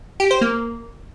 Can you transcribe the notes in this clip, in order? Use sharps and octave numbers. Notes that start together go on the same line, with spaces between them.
G4
C5
A#3